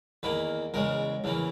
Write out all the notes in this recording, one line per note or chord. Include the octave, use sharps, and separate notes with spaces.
E2 D#3 A#3 B4
E2 C#3 G#3 A#4
E2 C#3 E3 A#3